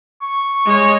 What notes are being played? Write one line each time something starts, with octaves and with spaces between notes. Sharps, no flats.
C#6
G#3 C#5